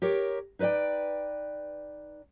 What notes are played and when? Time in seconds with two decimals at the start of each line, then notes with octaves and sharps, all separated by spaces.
0.02 G4 A#4 C#5
0.59 D#4 B4 C5 D5 G5